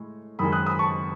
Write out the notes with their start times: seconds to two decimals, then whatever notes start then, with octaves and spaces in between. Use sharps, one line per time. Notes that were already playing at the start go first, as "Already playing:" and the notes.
Already playing: A2 G#3
0.39 F#2 D#3 G#3 B5 D#6
0.52 D#6 F#6
0.66 B5 D#6
0.79 A5 C#6